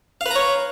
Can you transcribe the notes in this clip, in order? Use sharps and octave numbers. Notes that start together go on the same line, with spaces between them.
B4 C#5 F5 A#5